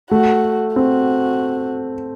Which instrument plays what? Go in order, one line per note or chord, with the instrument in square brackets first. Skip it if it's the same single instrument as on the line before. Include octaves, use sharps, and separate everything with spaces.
[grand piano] A3 [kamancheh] F#4
[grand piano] C4 [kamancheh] F#4